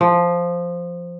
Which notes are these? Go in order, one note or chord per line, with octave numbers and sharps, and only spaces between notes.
F3